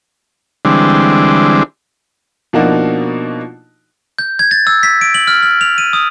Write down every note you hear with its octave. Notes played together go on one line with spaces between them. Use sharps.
D3 E3 G3 G#3 C4 D4
B2 F3 A#3 D4 D#4 F#4
G6
G#6
A6
E6
B6
D7
F#7
F6
F6
F7
D#7
D#6